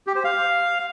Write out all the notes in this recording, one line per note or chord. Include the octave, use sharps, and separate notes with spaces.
G4
C5
F5